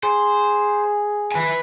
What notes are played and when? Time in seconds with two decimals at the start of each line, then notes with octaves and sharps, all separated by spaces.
0.03 G#4 C5
1.32 B4 G#5